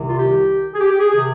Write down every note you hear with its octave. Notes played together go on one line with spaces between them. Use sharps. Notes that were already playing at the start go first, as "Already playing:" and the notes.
Already playing: C2 C3 D#3
F4
G4
G#4
G4
G4
G#4
C3 D#3 G#4